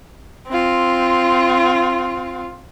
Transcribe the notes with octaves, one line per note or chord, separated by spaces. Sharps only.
C4 F4